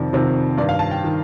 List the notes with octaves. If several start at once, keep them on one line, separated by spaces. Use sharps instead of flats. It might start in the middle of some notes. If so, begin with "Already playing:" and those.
Already playing: F2 C3 D#3 D5
F2 C3 D#3 C5
G2 D#3 D5
F5
A5
G5
D#3